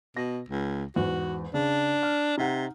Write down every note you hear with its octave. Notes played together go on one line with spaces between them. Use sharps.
B2 A#6
C#2
E2 G#2 F#4
C#3 D4 G#4
F6
C3 D#4 F#5